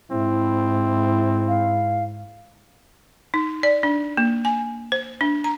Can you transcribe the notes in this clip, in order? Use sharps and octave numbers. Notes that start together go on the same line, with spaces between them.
G#2 C4 E4
F5
D#4
D5
D4
A#3
G#5
C5
D4
A#5